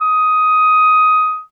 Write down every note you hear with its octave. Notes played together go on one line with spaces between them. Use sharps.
D#6